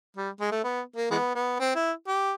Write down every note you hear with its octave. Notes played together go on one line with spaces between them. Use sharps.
G3
G#3
A3
B3
A#3
E3 G#3 B3
B3
C4
E4
G4